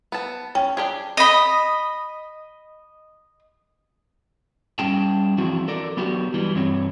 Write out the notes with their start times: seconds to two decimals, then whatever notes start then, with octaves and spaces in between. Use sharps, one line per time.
0.12 B3 A5
0.55 C#4 G5
0.77 D4 G4 G#4
1.17 D#5 B5
4.79 G3 C#4 G#4 G5 A5
5.38 E3 F3 C4 D4 E4 F#4
5.68 A4 A#4 D5
5.97 F#3 B3 D4 F#4 G4
6.34 E3 G3
6.55 G2 E3 C4 C#5